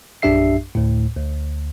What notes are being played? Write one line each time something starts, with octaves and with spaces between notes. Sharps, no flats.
A#1 F#2 D4 G4 E5 C7
D2 A2
D2